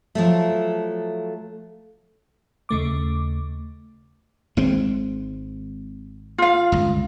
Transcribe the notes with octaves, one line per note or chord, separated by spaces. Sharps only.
F3 F#3 A3
D#2 C#3 A3 D6
G#1 G#3 C4
F4 F5
G1 C#2